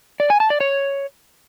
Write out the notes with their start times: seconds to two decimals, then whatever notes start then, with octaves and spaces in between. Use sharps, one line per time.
0.20 D5
0.30 G#5
0.40 A5
0.50 D5
0.60 C#5